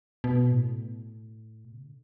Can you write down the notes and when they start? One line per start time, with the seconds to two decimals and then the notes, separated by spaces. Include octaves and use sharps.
0.24 B2
0.51 A2
1.65 B2
1.74 C#3
1.84 D3